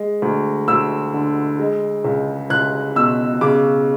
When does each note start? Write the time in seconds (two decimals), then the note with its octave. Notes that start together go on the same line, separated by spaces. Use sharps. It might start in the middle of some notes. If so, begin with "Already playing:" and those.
Already playing: G#3
0.22 D2
0.68 D2 E6
1.14 D3
1.59 G#3
2.05 C#2
2.50 C#2 F#6
2.96 B2 E6
3.41 C#3 D6